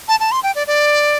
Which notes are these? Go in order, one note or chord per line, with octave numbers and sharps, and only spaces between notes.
A5
A5
C6
G5
D5
D5